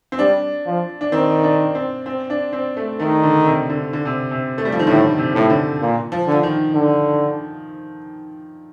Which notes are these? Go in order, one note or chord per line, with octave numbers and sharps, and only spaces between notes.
C4
G3 D4
F3
D4
D#3 C4
D4
C4
C4
D4
C4
A3
D#3 A3
D3
C3
D3
D3
C3
C3
A3
G3
F3
D#3
A2 D3
C3
A2
D3
A#2
F3
D3 F3
D#3
D3